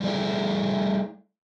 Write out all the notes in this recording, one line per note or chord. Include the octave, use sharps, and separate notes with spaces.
G3 A3 E4 G#4 A4 D5